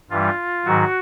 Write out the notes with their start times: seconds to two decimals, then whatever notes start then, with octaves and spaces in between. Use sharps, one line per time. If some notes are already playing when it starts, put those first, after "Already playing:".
0.10 G2 E3 G3 F4
0.65 G#2 D#3 F#3 F#4